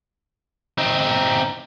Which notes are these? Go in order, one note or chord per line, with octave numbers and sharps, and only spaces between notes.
C4 D#4